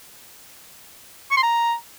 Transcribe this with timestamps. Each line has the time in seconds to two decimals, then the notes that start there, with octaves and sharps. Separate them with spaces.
1.31 C#6
1.37 C6
1.43 A#5